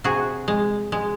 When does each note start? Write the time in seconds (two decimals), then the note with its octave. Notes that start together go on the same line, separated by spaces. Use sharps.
0.04 C3 F#4 G#4
0.48 G#3
0.92 G#3